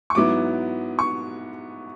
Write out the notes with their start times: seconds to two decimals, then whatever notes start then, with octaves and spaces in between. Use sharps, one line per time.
0.10 C#6
0.15 G#2 F#3 B3 E4 D6
0.99 C#6